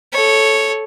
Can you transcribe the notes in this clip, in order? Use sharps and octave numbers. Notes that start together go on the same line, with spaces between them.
A4 C#5